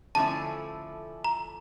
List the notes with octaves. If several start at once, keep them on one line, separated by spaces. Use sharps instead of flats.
D3 F3 A3 C#4 E4 A5
A#5